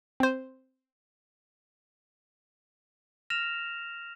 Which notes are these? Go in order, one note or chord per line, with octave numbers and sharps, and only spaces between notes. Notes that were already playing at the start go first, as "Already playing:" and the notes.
C4 C5
F6 A#6 E7 F7